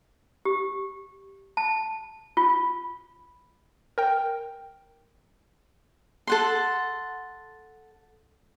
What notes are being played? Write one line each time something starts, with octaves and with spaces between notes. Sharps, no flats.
G4
A5
F4
A#4 G5
A4 F#5 C6